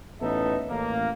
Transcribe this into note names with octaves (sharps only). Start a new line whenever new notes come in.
A1 B3 D#4 A4 E5
A1 A#3